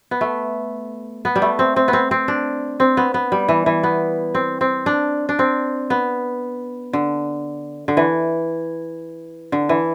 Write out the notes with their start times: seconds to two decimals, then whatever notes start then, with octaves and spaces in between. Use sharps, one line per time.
0.11 B3
0.21 A3
1.25 B3
1.36 G3
1.42 A3
1.59 C4
1.76 C4
1.88 B3
1.93 C4
2.11 C4
2.28 D4
2.80 C4
2.97 B3
3.14 B3
3.32 G3
3.49 E3
3.66 E3
3.83 B3
4.35 C4
4.61 C4
4.86 D4
5.29 D4
5.39 C4
5.90 B3
6.93 D3
7.88 D3
7.97 E3
9.52 D3
9.69 E3